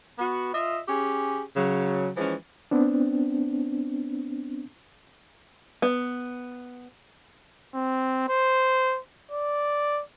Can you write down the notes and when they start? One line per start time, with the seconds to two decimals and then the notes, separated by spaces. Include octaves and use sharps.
0.18 B3 F#4
0.53 F4 D#5 E5
0.88 C#4 G4 G#4
1.56 C#3 F#3
2.17 E3 F3 G#3 C#4
2.71 B3 C4 D4
5.82 B3
7.75 C4
8.29 C5
9.31 D5